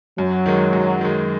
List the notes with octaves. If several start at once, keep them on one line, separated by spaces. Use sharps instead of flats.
F#2 F#3
D#3 G#3
F#2
D#3 G#3